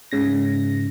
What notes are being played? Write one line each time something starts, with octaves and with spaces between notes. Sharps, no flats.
G#2 C#3 A#6